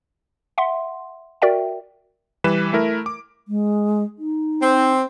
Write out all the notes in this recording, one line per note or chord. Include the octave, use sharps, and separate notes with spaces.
E5 F#5 C6
F#4 A#4 D5 E5 G5
E3 G3 B4 E7
A3 E4 A#4
D6
G#3
D#4
C4